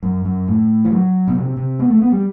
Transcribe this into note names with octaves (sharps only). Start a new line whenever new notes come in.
F#2
F#2
A2
E3
F#3
B2
C3
C3
B3
A3
B3
G3